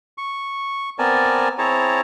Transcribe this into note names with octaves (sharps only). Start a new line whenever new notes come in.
C#6
B3 C4 A#4 D5 G#5 A5
C4 E4 G#4 C#5 A5 A#5